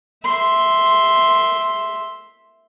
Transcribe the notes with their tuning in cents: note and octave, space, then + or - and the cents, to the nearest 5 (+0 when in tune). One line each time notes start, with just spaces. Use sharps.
E5 +0 C6 +0